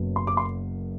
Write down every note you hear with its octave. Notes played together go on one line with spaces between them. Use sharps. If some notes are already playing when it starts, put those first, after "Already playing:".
Already playing: F#1 F#2 F#3 B3
C6
D6
C6